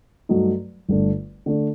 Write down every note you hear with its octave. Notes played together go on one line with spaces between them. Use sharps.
G2 F#3 A3 D#4
G1 G2 D3 A3 D4
D3 A3 D4